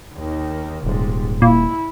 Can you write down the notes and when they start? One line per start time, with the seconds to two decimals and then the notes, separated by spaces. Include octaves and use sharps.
0.14 D#2 D#3
0.84 D#1 G#2 C3
1.42 A#2 E4